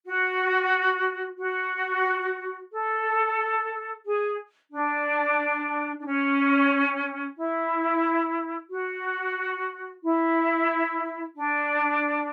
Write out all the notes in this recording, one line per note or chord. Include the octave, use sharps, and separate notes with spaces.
F#4
F#4
A4
G#4
D4
D4
C#4
E4
F#4
E4
D4